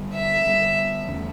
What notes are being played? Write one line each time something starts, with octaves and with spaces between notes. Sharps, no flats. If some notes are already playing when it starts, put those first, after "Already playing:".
Already playing: D3 G3 B3 D4
E5
D3 G3 D4
E2 D3 A3 C#4